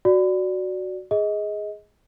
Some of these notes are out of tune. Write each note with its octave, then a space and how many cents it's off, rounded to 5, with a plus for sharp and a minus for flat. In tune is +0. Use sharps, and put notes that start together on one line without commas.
F#4 +0 D5 +0
G#4 +0 D#5 +20